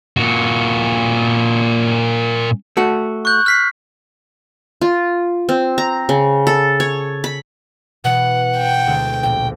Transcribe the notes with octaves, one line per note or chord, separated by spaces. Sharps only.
A#2 F#4
A3 F#4
C#6 F#6 G6
F6 B6 C7
F4
C4
A#5
C#3
A4
C#5
B5
B2 E3 B3 F#5
G5
D2 G#3 A4
A#1 G5